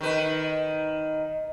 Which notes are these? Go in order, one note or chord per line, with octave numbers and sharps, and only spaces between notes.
D#3 B4